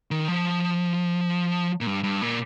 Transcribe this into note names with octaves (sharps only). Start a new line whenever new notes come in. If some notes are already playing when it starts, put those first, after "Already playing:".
D#3
F3
A#2
G2
G2
A#2